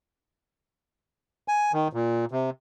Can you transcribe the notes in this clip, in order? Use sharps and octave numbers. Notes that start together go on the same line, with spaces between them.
G#5
D#3
A#2
C3